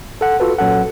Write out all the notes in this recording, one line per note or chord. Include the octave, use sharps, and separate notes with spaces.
A4 F#5
F4 F#4 A4 B4
A#2 F#3 C#4 A4 F#5